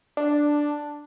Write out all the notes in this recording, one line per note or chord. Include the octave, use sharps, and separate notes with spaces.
D4